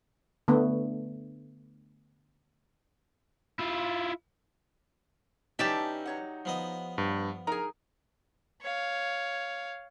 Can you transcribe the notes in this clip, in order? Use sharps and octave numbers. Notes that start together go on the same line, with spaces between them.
D3 A3 B3
E4 F4
E3 C#4 D#4 G4 D5 E5 A5
F#3 C#5 F#5
F3 B3 D#5
G2
D#4 G#4 A#4 A#5
C#5 F5